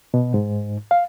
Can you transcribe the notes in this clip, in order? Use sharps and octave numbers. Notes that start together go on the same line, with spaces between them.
B2
G#2
F5